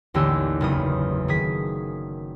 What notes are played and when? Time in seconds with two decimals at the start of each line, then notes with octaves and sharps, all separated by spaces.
0.14 A1 D#2 D3 G4 G#5 E6
0.61 F#1 E2 D#6
1.28 D#3 G#4 D#6 B6